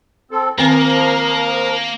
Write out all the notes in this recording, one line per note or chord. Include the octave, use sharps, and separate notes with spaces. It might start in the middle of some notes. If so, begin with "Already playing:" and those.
C4 A4
D#3 F3 A#3 C4 A#4 G#5